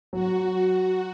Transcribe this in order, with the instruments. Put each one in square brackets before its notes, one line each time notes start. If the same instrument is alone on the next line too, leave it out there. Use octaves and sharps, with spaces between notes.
[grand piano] F#3 [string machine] F#4